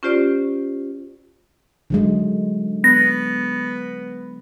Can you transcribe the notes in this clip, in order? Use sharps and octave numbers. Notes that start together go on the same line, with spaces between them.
C#4 F4 G4 C5 D5
D3 F#3 G#3
B3 A#6